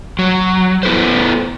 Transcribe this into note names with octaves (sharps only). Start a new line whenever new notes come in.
F#3
B3 E4 A4 B4 C5